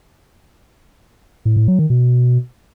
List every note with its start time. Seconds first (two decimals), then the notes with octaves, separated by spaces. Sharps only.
1.45 A2
1.57 A2
1.68 F#3
1.79 D#3
1.90 B2